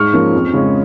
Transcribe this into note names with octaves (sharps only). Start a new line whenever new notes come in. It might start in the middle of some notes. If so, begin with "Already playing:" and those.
Already playing: G#2 C#6 F6
F3 A#3 C#4
F2
C#3 G#3 C#4